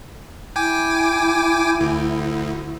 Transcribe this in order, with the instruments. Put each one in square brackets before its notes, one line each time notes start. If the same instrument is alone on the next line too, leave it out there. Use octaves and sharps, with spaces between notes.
[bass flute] E4 [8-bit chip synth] G5 G#5 D6
[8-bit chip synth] D2